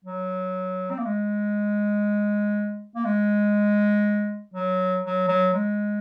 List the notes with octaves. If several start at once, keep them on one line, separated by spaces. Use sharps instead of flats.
F#3
C4
A#3
G#3
A#3
G#3
F#3
F#3
F#3
G#3